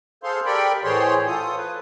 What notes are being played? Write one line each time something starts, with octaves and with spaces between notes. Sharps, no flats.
G#4 A4 C5 F5 C6
G4 A4 A#4 D5 G5 B5
A2 E3 G#4 C5 C#5 C6
F4 A4 D#6
B4